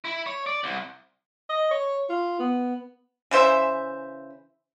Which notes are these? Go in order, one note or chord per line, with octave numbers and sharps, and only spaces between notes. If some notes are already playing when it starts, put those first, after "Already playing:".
E4
C#5
D5
C2
D#5
C#5
F4
B3
C#3 E3 C5 E5